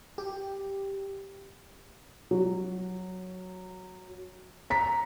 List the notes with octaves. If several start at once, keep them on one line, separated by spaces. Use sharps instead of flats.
G4
F#3
A#5 B6